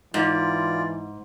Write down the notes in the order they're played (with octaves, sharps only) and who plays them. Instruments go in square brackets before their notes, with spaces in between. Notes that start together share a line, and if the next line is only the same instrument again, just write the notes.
[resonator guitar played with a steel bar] G#2 [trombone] E3 [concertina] F4 D5